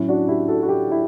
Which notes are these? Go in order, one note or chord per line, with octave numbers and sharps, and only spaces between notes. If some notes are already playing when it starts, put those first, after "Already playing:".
Already playing: A2 F#3 C#4 E4
D4 F#4
E4 G4
F#4 A4
F#4
E4 G4
E4